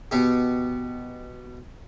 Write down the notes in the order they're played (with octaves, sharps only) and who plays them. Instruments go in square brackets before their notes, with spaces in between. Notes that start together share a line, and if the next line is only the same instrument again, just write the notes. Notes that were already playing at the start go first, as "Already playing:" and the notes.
[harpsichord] B2 G4